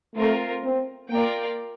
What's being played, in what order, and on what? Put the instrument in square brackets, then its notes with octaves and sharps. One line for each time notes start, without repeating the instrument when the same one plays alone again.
[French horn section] A3 [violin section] C4 F4 A#4
[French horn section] C4
[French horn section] A#3 [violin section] F4 A#4 D5 G5